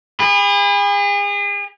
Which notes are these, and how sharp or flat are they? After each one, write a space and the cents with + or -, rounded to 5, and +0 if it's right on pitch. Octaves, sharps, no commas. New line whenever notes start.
G#4 -40 B5 +0